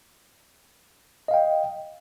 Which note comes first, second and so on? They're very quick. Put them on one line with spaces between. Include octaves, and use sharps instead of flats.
D#5 F5 G5